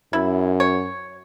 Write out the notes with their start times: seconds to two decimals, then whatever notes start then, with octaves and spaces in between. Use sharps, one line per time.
0.13 F#2 E4
0.60 C#5